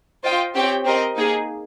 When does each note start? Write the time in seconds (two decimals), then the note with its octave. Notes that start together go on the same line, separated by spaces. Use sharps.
0.24 F4 C5 D#5 G5
0.54 C4 G4 C#5 G5
0.85 C4 G4 A#4 D#5
1.16 A#3 D#4 G#4